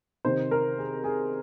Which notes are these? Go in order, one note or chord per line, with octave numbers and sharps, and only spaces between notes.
C3 D#3 C5
A#4
G#4
G#4